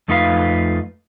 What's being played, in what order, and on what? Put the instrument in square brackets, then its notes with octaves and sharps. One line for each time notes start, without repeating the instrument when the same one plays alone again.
[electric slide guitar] F2 A3 D#4 F4 B4 F5